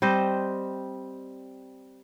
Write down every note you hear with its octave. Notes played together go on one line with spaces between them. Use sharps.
G3 C4 C5 D#5